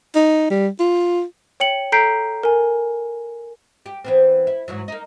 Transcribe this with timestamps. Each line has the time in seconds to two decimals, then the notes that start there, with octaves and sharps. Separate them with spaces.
0.15 D#4
0.50 G3
0.80 F4
1.60 C#5 G5 C#7 F#7
1.92 A4 A#5 G6 B6 C7 D7
2.43 A#4 G#5
3.86 G4
4.04 E3 B3 C4
4.47 E4
4.68 G#2 E3 F#3
4.88 A#3 D#4